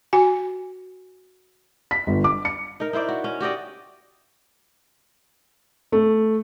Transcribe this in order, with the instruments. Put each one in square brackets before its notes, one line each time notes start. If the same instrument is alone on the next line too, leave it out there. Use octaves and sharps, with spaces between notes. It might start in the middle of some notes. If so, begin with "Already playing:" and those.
[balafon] F#4 G#5
[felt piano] B6
G1
D6
C#7
[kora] D#4 A#4
D#4 E4 C5 D5
F#4
C#4
F#4 G4 D5 D#5
[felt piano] A3